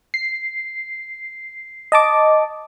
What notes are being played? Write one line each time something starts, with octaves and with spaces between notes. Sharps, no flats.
C7
D#5 A5 D6